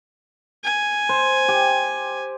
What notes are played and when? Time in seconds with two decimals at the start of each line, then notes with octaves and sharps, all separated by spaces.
0.64 G#5
1.09 C5
1.48 G4